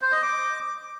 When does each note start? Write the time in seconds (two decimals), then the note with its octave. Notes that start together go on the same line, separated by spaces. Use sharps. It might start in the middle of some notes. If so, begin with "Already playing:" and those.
0.02 C5
0.12 D#5
0.23 D6